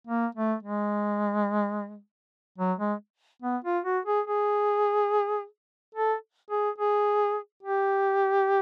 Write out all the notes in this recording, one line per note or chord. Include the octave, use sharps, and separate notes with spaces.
A#3
A3
G#3
F#3
G#3
B3
F4
F#4
G#4
G#4
A4
G#4
G#4
G4